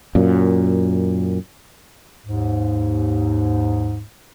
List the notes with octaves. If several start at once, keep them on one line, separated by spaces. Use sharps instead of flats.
F#2 A#2
D#2 G#2